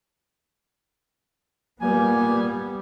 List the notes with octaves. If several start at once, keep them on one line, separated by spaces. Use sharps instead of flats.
A#2 G3 A#3 B3 G#5